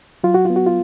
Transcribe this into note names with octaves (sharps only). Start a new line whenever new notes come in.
F#3 F4
F#4
B3 F4
F#4
F4